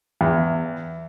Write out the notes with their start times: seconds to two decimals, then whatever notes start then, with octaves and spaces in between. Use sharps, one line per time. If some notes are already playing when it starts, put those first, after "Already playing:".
0.21 E2